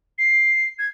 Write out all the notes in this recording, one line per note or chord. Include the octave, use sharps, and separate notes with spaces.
C7
G#6